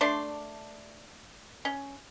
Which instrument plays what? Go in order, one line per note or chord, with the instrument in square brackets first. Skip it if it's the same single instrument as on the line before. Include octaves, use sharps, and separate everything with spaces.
[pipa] A3 D4 D5 C6
C#4